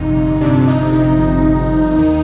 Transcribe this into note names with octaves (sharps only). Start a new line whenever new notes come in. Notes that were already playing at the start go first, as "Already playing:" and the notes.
Already playing: G1 F2 C3 D#4
G1 F2 C3 D4
D#4
D#4
G1 F2 C3
D#2 D#3